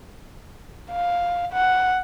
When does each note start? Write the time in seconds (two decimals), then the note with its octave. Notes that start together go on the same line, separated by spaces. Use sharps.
0.91 F5
1.53 F#5